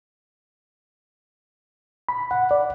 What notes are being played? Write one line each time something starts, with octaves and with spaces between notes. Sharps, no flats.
B5
F#5
D5